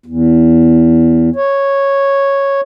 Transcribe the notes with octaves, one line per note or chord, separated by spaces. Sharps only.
E2
C#5